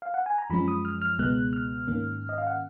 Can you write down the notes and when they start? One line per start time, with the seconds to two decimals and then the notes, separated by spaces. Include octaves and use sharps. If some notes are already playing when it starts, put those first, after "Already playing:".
0.02 F5
0.14 F#5
0.26 G#5
0.38 A#5
0.50 F#2 F3 G#3 C#4 B5
0.68 D#6
0.85 F6
1.02 F6
1.19 C#2 B2 G#3 B3 F#6
1.53 F6
1.87 G#2 D#3 A#3 C#4
2.29 D#5
2.38 F5
2.47 F#5